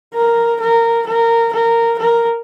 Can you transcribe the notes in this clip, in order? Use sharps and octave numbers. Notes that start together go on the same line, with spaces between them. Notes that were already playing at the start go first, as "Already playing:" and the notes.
A#4
A#4
A#4
A#4
A#4